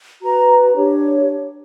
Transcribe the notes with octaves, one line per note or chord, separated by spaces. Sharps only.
F#4 B4 A#5
D4 G4 C#5